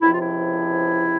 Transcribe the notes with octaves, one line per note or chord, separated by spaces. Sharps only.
C#2 C3 F3 E4
F4
E4